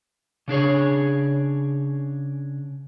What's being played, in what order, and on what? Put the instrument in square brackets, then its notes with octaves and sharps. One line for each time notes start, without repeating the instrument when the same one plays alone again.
[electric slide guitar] C#3 D4 G#4 C#5